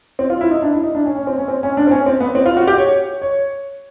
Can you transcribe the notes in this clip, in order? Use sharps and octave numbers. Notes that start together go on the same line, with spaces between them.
C4
F4
E4
D#4
D4
E4
D#4
D4
C#4
C#4
C4
C#4
C4
C#4
D4
C4
C#4
C4
B3
C4
F4
F#4
G4
C#5
C#5